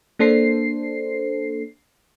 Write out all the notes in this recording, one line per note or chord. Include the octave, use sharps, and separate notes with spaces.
A#3 D4 A4 C5 C7